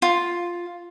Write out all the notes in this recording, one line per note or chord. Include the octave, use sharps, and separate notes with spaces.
F4